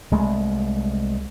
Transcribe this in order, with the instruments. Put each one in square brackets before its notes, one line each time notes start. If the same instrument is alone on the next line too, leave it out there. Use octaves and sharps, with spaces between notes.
[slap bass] C2 G#3 A3